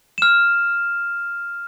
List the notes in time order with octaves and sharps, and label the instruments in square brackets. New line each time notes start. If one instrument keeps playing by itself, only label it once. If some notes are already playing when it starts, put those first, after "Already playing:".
[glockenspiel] F6 E7